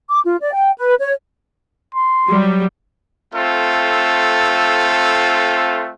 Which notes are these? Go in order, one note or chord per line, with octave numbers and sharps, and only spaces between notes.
D6
F4
D5
G5
B4
C#5
C6
F#3 G3
A3 C4 F4 A4